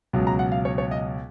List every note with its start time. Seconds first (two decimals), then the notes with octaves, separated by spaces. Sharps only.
0.13 C#2 B2 F#3
0.27 A#5
0.39 F#5
0.52 F5
0.65 C#5
0.78 C#5
0.91 D#5